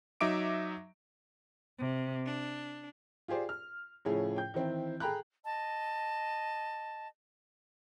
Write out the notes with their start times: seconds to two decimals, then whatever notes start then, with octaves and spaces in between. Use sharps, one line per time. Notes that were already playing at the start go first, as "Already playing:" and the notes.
0.21 F#3 D#4 E5 D6 D7
1.78 C3
2.27 D4
3.28 F4 G4 G#4 C5 D5
3.49 F6
4.05 A2 C#3 F3 C#4 E4 G#4
4.36 G5 G6
4.54 D#3 E3 C4 E4
5.00 G#4 A4 G5 A#5 B5 F#6
5.44 D#5 A5